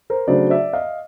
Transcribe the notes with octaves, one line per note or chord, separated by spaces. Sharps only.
A#4 C5
C#3 F#3 A3 D4 C5 D5
D5 E5
D#5 F5